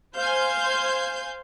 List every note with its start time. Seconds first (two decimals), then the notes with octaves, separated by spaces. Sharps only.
0.16 C5 F5 G#5 G6